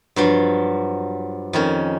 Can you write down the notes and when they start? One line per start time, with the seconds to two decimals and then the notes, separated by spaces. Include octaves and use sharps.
0.16 G2 F3 F#3
1.53 F2 D#3 C#4